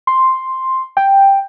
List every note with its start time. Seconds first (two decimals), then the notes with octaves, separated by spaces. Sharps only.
0.07 C6
0.97 G5